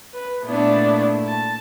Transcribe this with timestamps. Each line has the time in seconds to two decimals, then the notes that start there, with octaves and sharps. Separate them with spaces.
0.13 B4
0.45 A#2 A3 B3 D4 E4
1.27 A5